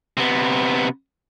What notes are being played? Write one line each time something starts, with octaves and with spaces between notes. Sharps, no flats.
C3 B3